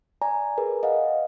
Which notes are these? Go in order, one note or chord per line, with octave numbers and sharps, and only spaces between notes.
D5 G#5 A#5
G#4 A#4 B4
D#5 F5 F#5